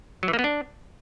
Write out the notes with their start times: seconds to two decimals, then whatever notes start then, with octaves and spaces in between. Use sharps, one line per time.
0.23 F#3
0.28 E3
0.33 A#3
0.39 B3
0.44 D4